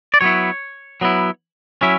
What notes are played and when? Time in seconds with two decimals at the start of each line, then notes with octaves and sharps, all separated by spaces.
0.14 D5
0.21 F#3 B3 E4 C#5
1.01 F#3 B3 E4
1.81 F#3 C#4 E4 E5